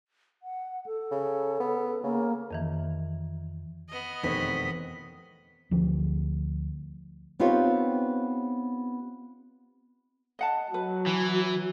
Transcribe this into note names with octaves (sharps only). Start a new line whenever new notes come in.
F#5
A4
C#3
B3
C#3 A#3
F2 D#3 E3
B3 D#5
F1 E2 B2 D#3 C4 C#5 B6
D2 F3
B3 C4 D#4 F4 G4 C#5
D#5 F#5 A5
F#3 B4
E3